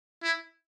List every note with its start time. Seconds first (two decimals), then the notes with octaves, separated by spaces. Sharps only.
0.24 E4